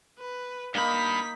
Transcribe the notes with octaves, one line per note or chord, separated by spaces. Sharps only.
B4
G2 A#3 D#4 B5 B6